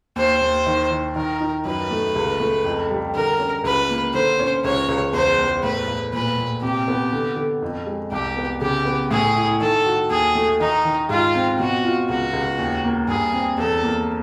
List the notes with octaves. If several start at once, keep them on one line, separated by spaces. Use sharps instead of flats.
D#2 C5
D#2
D#3
D#3
D#3 A#4
D#4
F#2 B4
A3
C#2
A3
F2
G3
D3 A#4
C#4
C#2 B4
A#3
D3 C5
C#4
C#2 C#5
C#2
E2 C5
E2
A2 B4
A2
A#2 B4
A#2
C3 G4
B3
D3
D3
F2
G#3
C2 G4
B3
C#3 G4
B3
A2 G#4
E4
D#3 A4
F#4
D#2 G#4
A3
D#3 D#4
D#3
G#2 F4
C4
B2 F#4
F4
C#2 F#4
C#2
D#2
A#3
G2 G#4
C4
E2 A4
A#3